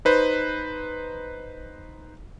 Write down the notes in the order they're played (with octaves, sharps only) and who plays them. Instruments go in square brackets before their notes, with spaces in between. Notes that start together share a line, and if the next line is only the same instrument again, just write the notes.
[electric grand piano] D#4 B4 C5